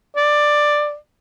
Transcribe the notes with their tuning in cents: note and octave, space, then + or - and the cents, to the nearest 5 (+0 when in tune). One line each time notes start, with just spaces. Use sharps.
D5 +10